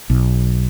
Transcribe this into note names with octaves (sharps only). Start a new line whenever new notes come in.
B1